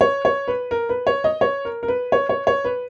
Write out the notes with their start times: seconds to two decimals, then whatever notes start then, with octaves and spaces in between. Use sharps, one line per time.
0.01 C#5
0.25 C#5
0.48 B4
0.71 A#4
0.89 B4
1.07 C#5
1.24 D#5
1.41 C#5
1.65 A#4
1.83 A#4
1.88 B4
2.12 C#5
2.29 C#5
2.47 C#5
2.64 B4